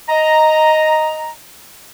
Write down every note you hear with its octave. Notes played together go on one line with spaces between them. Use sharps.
D#5 A#5